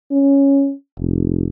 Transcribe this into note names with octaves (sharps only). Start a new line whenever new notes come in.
C#4
F1